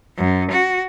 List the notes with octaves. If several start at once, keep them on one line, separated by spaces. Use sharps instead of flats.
F#2
F#4